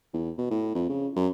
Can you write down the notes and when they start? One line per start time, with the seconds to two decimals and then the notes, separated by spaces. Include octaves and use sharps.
0.14 E2
0.38 B2
0.51 A2
0.75 F2
0.89 C#3
1.16 F#2